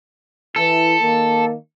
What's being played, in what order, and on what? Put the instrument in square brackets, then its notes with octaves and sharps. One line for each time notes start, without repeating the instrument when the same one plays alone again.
[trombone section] E3 E4 [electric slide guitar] A4
[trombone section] D#3 A#3